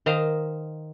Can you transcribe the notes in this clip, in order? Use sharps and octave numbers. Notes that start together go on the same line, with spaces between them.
D#3 C5 D#5 F5 A#5